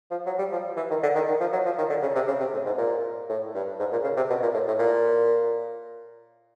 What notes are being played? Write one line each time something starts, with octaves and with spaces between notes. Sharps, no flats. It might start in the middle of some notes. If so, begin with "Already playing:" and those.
F3
F#3
G3
F3
E3
D#3
D3
D#3
D#3
F3
F#3
F3
D#3
D3
C#3
C3
C#3
C3
A2
G#2
A#2
A2
G2
G#2
A#2
C#3
C3
B2
A#2
A2
A2
A#2